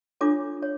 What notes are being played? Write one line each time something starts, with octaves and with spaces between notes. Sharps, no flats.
D4 F4 A4 C#5 D6
C#5